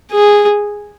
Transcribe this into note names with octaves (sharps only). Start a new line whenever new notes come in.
G#4